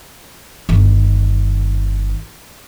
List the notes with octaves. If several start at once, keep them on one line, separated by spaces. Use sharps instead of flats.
G1 D#3